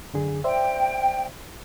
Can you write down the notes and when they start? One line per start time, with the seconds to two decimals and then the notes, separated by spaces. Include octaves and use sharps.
0.13 F#2 D3 G#4
0.44 C5 D5 E5 G5